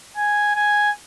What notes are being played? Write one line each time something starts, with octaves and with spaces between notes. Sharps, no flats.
G#5
G#5